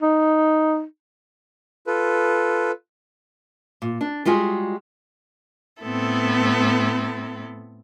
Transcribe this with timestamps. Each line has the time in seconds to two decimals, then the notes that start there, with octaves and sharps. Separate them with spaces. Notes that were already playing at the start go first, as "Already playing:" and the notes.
0.02 D#4
1.87 F4 A4 B4
3.82 A#2
4.01 D4
4.26 G3 G#3 F4 F#4 G#4
5.82 A2 B3 C4 E4 A4